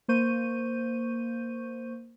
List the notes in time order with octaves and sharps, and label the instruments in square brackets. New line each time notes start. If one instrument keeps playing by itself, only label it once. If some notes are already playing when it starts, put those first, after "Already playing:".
[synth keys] A#3 C5 C#6 G6 D#7